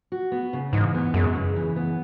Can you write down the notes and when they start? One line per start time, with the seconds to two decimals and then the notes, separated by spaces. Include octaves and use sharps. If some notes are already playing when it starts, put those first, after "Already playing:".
0.12 F#4
0.32 B3
0.53 C#3
0.73 G#2 E3
0.94 B3
1.14 F#2 G#3
1.35 C#3
1.56 E3
1.76 B3